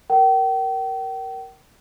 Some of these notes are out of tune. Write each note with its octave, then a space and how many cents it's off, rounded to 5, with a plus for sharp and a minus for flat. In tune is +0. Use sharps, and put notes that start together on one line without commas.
A#4 +0 G5 -35